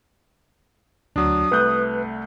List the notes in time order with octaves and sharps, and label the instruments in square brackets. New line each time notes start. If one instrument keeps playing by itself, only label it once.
[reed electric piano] D2 [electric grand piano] F#3 D4 [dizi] D#6
[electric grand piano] C2 A3 G6 [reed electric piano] B4 F#6